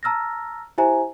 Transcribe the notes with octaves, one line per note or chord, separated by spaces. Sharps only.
A5 A#5 E6 F6 A6 A#6
E4 G4 C5 E5 G#5 A#5